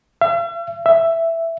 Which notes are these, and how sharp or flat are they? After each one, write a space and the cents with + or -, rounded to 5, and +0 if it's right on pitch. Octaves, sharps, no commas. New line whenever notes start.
E5 +45
E5 +5